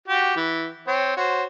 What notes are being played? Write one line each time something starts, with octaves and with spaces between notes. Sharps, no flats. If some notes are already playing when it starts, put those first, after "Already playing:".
F#4 G4
E3
C4 C#5
F#4 C5 C#5